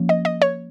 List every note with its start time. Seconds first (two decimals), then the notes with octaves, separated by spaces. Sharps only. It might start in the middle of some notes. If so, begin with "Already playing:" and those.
Already playing: F3 A#3 C#4
0.09 D#5
0.25 D#5
0.42 C#5